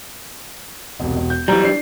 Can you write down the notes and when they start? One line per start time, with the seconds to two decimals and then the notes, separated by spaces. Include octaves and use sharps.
0.99 E1 C2
1.16 E1
1.30 G6
1.48 E3 F#3 G3 A#5
1.64 D4 C7